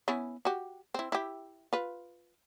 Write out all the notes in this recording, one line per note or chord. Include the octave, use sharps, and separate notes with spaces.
B3 C#4 E4
F#4 G4
C4 E4
E4 G4
F4 B4